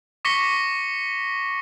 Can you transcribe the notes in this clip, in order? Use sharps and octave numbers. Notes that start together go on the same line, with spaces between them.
C#6 D6 A#6 B6 C#7 G7